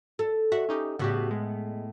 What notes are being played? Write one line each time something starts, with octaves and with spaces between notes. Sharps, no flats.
A4
F#4 E5 F#5
C#4 D#4 G4
A2 C#3 B3 F#4 G4
G#3